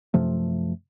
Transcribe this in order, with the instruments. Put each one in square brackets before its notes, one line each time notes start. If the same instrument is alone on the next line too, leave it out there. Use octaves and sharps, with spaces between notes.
[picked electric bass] F#2 C3 F3 A3